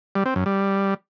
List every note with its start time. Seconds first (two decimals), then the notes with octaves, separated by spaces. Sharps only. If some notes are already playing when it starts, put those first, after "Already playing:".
0.15 G3
0.26 C4
0.36 F#2
0.46 G3